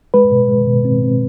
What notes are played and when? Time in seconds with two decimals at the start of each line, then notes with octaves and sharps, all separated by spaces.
0.14 G#3 B4
0.31 B2
0.49 G#3
0.67 B2
0.85 C4
1.03 C4